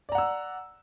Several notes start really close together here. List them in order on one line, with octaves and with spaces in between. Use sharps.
D5 A#5 F#5 E6